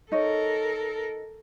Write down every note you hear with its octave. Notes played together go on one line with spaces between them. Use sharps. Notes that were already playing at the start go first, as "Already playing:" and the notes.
D#4 A4 A#4 C#5